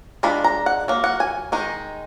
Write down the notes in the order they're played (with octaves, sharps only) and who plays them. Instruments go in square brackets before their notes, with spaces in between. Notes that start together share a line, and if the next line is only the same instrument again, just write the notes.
[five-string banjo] G#3 D4 F4 B5
A#5
F#5
F#3 A#3
F#5
G#5
D#3 G#3 D#4